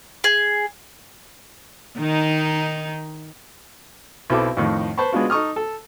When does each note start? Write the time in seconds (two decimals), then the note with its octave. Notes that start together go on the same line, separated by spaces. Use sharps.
0.24 G#4
1.98 D#3 D#4
4.30 B1 C4 E4 A4 D6
4.57 F2 A2 D#3
4.98 B4 C5 A5 B5 C#6
5.13 G#3 B3 C#4 D4 F4 F#4
5.30 D#4 A4 C#6 D#6 F6
5.56 A4